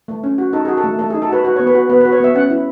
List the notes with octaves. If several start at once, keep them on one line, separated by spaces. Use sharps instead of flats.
A3
C#4
F#4
D#4 A4
F#4 G#4
A4
A3
A3 A4
G#4
D#4
A4
F#4 B4
F#4 B4
C#5
B3
B4
F#4
B3 B4
B4
F#4
C#5
B3 E5
C#4 F#5
E4